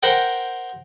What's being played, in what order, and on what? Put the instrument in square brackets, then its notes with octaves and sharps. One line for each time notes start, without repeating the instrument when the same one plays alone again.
[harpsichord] A#4 C5 F#5 G5